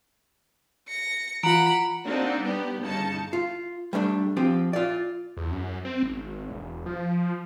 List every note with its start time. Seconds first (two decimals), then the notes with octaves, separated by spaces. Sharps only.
0.89 A#6 C#7
1.43 E3 F4 F#5 A#5 B5 D7
2.06 A#3 C4 D4 D#4 F#4
2.42 G3 B3 G4
2.82 G1 C#3 D#4 A5 C#7
3.33 F4
3.93 G3 A3 C#4 D4
4.37 F3 C4 G4
4.73 F4 D5
5.37 E2
5.51 F#2
5.85 C4
6.03 G#1
6.50 E1
6.86 F3